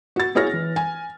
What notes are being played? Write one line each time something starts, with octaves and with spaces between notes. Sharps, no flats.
F#4 A6
E4 F#4 G#4 C#5 F6 A#6
E3
G#5